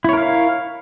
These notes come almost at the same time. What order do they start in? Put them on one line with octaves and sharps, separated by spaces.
E4 C#5 A#4 F5